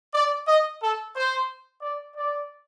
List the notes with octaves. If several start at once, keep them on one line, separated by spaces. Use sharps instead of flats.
D5
D#5
A4
C5
D5
D5